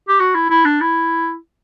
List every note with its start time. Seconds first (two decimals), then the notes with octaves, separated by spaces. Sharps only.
0.08 G4
0.20 F#4
0.35 E4
0.50 E4
0.65 D4
0.81 E4